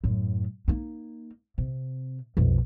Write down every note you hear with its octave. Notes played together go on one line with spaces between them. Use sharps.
F#2 A2
A#3 D#4
C3
B1 F2